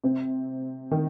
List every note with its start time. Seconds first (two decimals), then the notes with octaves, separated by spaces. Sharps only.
0.04 C3 C4
0.91 D#3